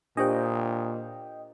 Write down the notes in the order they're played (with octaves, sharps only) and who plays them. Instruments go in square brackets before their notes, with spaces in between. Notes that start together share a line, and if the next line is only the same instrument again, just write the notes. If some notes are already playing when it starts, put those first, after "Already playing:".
[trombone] A#2 [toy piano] D4 G4 C5 [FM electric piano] D#5 G5